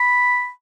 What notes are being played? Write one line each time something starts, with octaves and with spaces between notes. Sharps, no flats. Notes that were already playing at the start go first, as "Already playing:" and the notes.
Already playing: B5